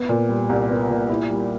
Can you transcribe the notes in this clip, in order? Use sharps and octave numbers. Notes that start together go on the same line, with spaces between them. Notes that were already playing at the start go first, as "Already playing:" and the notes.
Already playing: B3
A#2
G3
C2
B3
A#2
E4
G3